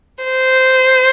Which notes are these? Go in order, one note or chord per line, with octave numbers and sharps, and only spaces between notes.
C5